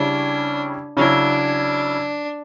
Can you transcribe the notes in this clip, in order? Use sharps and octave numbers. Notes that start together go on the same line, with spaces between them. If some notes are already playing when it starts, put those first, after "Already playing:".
Already playing: C#3 G3 C#4 D4 E4
C#3 F#3 C#4 D4 E4